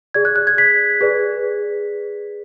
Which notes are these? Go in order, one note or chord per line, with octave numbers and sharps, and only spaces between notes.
G#4 D5 G#6
F#6
F#6
G#6
B6
G#4 B4 D5